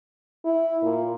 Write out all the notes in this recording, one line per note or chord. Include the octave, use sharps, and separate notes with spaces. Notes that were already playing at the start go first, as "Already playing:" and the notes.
E4
A#2